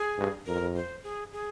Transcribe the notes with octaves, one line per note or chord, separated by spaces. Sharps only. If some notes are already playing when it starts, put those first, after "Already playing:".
Already playing: G#4
G2
F2 A#4
C5
G#4
G#4